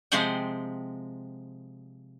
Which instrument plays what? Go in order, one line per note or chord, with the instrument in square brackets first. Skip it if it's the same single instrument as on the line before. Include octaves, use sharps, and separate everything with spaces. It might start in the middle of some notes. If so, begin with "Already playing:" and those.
[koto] C3 F3 G#3 C5 F#5 G5